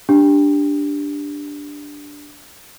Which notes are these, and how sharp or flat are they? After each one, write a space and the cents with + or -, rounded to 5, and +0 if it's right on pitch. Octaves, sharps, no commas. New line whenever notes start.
D4 -5 G4 +5